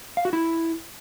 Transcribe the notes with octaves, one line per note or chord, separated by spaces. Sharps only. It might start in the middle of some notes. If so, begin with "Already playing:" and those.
F5
F#4
E4